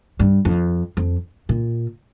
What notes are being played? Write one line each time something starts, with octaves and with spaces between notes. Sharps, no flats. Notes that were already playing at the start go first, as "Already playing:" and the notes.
G2
F2
F2
A#2